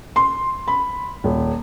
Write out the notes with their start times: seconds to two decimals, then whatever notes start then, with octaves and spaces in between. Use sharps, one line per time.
0.16 C6
0.68 B5
1.24 D#1